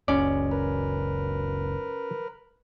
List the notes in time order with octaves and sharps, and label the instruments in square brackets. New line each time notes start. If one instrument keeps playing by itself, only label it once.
[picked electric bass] F#1 C#2 [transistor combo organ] G#3 [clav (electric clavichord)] C#4 D5
[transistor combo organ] A#4 B4